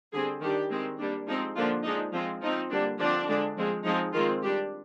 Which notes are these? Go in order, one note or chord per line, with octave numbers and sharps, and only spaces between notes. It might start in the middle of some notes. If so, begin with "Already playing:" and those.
D3 G3 C4 G#4
D#3 G3 D4 G4
D#3 G#3 C4
G3 A#3 D4
F3 G#3 C4 D#4
D3 F3 A#3 D4 F4
F3 G#3 D4 D#4
F3 G#3 C4 F4
F3 C4 D#4
D3 G3 A#3 D4
D3 F3 C4 D4
D3 G#3 D4
F3 G#3 C4
F3 G#3 C4 D#4
D#3 G#3 C4 F4
G3 D4 G4